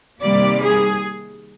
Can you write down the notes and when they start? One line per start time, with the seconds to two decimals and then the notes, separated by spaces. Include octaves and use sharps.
0.21 C3 D#3 G3 A#3 D5
0.61 G#4